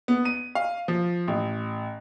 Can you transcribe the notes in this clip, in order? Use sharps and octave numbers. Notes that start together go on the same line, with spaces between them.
B3
D#7
F5
F3
A1